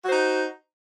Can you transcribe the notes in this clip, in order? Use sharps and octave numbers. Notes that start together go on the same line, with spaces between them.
D#4 F#4 C5